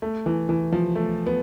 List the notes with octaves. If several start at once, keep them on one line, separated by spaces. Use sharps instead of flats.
A3
E3
E3
F3
A3
B3